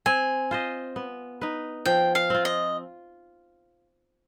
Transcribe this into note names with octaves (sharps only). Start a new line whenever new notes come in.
C4 G#5
F4 C5 D#5
B3
D#4 B4
F3 G5
F5
C4 F4
D#5